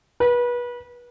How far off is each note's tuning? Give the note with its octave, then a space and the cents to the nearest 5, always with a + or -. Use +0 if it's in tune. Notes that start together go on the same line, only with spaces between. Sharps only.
B4 -30